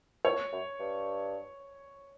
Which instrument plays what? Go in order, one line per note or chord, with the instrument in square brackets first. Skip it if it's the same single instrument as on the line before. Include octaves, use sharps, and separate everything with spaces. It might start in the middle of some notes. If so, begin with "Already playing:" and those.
[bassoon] A2 [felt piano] C#5
[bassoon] F#2
G2